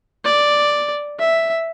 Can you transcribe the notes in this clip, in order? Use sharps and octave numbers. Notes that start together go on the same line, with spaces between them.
D5
E5